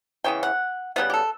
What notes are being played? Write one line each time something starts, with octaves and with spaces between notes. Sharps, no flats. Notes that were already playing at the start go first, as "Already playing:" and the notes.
C#3 E3 B3 G5
F#5
C#3 G3 B3 F#5
G4
A4